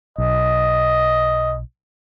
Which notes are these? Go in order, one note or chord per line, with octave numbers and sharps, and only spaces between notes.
B1 D#5